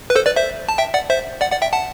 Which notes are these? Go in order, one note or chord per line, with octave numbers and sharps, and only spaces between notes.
B4
A4 C5
B4 D5
C5 E5
A5
E5 G5
D5 F#5
C5 E5
D5 F#5
D5 F#5
E5 G5
F#5 A5